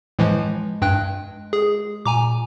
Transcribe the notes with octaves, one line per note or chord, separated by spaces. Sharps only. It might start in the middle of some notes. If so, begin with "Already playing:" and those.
A2 E3 F3 G#3
G2 G5 F#6
G#4
A#2 G#5 A#5 D6